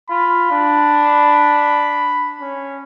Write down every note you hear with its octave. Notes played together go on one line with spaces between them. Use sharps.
F4 B5
D4
C#4